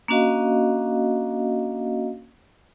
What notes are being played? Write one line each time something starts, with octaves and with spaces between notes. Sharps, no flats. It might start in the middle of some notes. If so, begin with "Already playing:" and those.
A#3 C#4 D4 F#4 D#5 F5